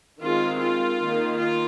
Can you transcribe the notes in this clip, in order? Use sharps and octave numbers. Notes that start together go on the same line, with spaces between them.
D#3 G#3 C4 F4
F4
D#3 A#3
F4